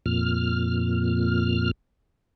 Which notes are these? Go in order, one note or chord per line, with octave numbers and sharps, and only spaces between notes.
F2 A#2 F6